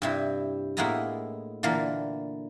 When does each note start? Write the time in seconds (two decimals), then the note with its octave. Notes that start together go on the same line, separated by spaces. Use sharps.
0.02 G2 C3 E4
0.77 A2 G#3 A#3 B3 E4 A#5
1.63 A#2 D3 E3 A#3